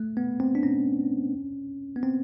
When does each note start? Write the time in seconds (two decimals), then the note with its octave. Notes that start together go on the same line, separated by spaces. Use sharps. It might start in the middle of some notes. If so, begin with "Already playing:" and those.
Already playing: A3
0.17 B3
0.40 C4
0.55 D4
0.63 C#4
1.96 B3
2.03 C4